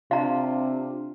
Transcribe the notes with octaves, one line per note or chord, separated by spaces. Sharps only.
C3 D4 F4 F5 A#5